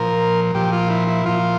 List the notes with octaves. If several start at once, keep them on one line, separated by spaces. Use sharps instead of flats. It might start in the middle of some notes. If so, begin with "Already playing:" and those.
Already playing: A#2 F3 A#4
A#2 F3 G4
F4
E4
E4
A#2 F3 F4